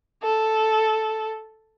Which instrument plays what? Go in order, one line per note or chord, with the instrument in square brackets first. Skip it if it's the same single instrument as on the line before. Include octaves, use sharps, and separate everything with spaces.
[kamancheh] A4